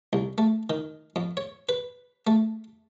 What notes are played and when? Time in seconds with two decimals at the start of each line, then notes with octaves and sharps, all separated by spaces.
0.13 C2
0.38 A3
0.70 D#3
1.16 F2
1.37 C#5
1.69 B4
2.27 A3